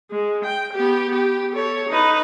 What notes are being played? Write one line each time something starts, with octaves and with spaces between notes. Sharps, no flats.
G#3
G5
B3 G4
G4
A4 C#5
D#4 B4